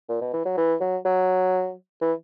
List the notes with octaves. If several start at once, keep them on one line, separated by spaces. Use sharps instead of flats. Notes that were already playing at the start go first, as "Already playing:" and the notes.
A#2
B2
E3
F#3
E3
F#3
F#3
E3